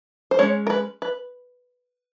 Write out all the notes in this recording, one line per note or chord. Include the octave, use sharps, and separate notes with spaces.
C5
G#3 C#4 C#5
A#4
B4
B4